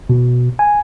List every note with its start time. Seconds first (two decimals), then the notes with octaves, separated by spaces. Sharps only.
0.10 B2
0.59 G#5